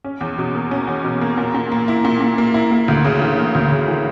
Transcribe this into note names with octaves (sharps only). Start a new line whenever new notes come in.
C#4
E2
B2
A#3
C#4
E2
B2
A#3
A#2
A#2
A#3
E4
A#2
A#2
A#3
E4
A#3
D2
C#3
E3
A#3
D2
C#3
E3